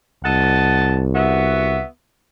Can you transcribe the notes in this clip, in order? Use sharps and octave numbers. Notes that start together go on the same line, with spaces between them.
C2 D#5 F#5 A5
B3 F#4 E5